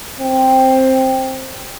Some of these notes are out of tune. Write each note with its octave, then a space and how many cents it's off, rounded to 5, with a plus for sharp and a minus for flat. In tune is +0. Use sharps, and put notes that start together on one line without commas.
C4 +5